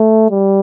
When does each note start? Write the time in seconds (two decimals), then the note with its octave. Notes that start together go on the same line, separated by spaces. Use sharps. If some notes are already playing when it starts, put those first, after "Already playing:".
Already playing: A3
0.31 G3